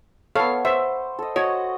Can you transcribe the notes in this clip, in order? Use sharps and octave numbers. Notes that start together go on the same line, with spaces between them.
B3 A4 C#5 F5
C5 E5
A4 D#5
F#4 C#5 D#5 F#5